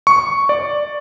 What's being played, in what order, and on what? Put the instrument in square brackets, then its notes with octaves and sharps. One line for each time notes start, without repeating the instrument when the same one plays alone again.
[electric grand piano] C#6
D5